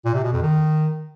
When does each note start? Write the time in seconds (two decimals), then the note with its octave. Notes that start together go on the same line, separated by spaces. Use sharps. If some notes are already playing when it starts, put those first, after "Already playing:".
0.05 A#2
0.14 C3
0.24 B2
0.33 F2
0.42 D#3